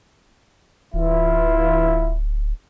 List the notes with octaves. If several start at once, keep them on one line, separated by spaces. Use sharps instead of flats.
D1 E3 E4 F4